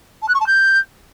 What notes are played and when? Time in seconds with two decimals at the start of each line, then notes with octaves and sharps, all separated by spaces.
0.22 A5
0.28 F#6
0.34 C#6
0.40 A5
0.46 G6